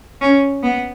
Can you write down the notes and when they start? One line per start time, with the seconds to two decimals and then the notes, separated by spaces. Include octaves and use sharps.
0.21 C#4
0.63 B3